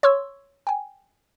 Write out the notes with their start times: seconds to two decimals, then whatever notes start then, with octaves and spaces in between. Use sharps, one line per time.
0.03 C#5 C6 C#6 E6
0.67 G5 G#5